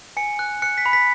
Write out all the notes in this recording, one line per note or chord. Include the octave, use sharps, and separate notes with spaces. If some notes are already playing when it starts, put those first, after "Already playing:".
G#5 C#7
F#6
F#6 C#7
B6
B5
B6